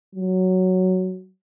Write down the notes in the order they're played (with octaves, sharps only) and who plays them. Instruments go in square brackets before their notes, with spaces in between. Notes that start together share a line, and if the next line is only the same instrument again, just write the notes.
[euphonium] F#3